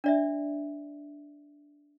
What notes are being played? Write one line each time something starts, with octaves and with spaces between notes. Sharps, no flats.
D4 D5 E5